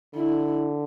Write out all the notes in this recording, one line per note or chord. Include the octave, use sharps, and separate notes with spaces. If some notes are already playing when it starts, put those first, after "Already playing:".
D3 E4